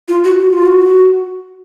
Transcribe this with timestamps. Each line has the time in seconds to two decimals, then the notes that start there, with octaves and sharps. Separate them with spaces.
0.08 F4
0.24 F#4
0.40 F#4
0.53 F4
0.65 F#4